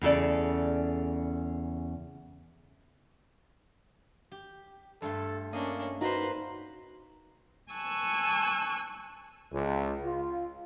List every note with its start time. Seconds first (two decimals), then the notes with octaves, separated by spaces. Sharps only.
0.01 E2 C#3 A4 D5
4.32 G4
5.02 G2 A3 A4 C6
5.53 A#3 C#4 D4 D#5
6.01 A#3 D#4 F#4 B4 C5 A#5
7.71 G#5 A5 C#6 E6 F#6
9.52 C#2
10.05 F4